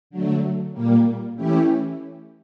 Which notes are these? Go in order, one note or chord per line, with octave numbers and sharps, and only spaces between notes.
D3 F#3 A3
A#2 G3 A#3
E3 A3 C#4 E4 G4